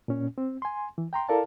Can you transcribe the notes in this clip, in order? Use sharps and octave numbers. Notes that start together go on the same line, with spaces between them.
A#2 C#4
C4
G#5 C6
E3
G5 A#5 C6
E4 A4 A#4 D5 F5 A5